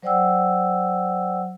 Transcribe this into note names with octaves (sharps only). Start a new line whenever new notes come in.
F#3 C5 D5 F#5 G5 E6